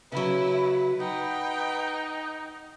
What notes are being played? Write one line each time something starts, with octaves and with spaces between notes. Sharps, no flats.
C#3 F#3 E4 B4
D#4 F#5 G5